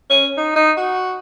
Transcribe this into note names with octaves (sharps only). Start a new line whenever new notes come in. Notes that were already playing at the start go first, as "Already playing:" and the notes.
C#4
D#4
D#4
F#4